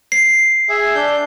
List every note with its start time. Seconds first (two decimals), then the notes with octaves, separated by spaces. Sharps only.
0.12 C7
0.69 G#4 E5
0.95 D4 G6